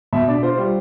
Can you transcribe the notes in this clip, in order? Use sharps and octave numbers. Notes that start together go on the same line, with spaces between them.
B2 E5
D4 D5
F4 C5
G3